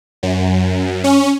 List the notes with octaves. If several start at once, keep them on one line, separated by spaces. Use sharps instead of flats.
F#2
C#4